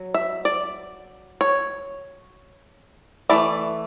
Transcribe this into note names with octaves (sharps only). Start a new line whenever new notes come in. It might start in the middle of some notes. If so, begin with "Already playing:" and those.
Already playing: F#3
E5
D5
C#5
E3 A3 D5